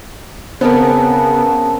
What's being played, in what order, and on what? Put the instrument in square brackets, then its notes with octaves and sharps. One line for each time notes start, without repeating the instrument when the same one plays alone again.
[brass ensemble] C#3 [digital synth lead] B3 [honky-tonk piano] C4 A#4 [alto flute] A5